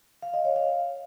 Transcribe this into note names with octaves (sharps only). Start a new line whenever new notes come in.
F5
D#5
C#5
F5